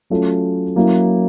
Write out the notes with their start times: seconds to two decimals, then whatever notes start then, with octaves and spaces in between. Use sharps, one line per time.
0.10 F#3 A3 C#4 F4
0.76 F#3 A#3 C#4 E4